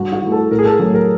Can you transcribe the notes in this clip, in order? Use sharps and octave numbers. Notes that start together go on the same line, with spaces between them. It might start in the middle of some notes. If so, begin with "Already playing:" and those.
Already playing: G2 F#4
F#4
E3 A3
A4
A2 A#4
G#4
A4
F#3 A3 G#4
A#4